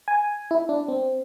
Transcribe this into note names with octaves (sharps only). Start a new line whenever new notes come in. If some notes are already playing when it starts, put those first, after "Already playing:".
G#5
E4
D4
C4